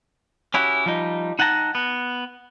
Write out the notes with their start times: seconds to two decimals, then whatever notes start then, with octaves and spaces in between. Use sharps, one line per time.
0.54 C#4 E4 F#4 G4
0.86 F3 G3 D#4
1.39 D#4 F#5 G5 A5 A#5
1.75 B3